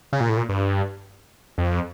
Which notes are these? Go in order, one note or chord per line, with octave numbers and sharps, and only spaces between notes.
C#3
A#2
A2
A#2
G2
F2